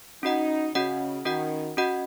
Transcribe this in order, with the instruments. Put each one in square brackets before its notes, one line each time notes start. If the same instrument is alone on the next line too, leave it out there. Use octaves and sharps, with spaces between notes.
[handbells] C#4 F#4 D#5 F#5 [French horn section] D#4
[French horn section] C#3 [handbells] C#4 F#4 D#5 F#5
[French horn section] D#3 [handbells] C#4 F#4 D#5 F#5
[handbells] C#4 F#4 D#5 F#5